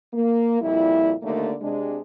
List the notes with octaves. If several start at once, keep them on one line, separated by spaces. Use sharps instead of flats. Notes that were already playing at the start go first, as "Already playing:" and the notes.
A#3
F2 A#2 G3 E4
D#2 D3 D#3 A3 A#3 D5
C3 G#3 D4